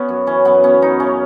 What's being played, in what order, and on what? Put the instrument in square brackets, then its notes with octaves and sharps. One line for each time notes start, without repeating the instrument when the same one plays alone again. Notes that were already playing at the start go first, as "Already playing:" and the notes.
Already playing: [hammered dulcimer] B3 C#4 F#4
F#2
E3 C#4
F#2 B3
B3 C#4
B3 D#4
C#3 C#4